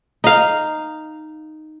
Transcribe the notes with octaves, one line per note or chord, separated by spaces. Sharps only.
D#4 F5